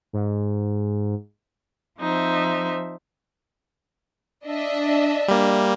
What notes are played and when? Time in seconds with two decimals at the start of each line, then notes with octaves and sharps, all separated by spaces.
0.13 G#2
1.99 F3 C4 D#4 C5 E5
4.46 D4 D#5 E5
5.28 G3 A#3